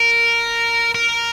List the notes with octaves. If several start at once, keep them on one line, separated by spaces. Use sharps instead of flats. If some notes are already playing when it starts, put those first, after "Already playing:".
Already playing: A#4
A#4